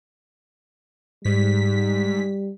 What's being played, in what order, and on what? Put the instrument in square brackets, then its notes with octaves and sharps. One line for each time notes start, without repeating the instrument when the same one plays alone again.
[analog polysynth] G#2 B6 [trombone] G3